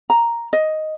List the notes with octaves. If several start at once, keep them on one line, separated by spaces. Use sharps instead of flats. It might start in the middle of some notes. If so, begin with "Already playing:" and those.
A#5
D#5